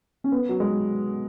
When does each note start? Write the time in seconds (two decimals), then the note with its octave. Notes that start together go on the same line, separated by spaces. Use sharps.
0.24 C#4
0.32 B3
0.49 F#3
0.60 G#3